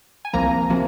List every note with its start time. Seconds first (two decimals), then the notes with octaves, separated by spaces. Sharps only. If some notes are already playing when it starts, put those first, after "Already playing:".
0.25 G#5
0.33 C2 C3 F3 A#3 A#5
0.70 C3 F3 A#3